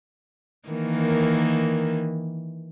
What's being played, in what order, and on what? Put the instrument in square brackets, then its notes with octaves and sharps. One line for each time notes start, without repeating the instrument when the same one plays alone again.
[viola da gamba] D#3 E3 A#3